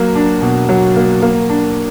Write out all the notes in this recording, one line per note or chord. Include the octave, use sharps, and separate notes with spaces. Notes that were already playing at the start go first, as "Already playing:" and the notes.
Already playing: F#3 A#3
D4
B2
F#3
A#3
A#3
D4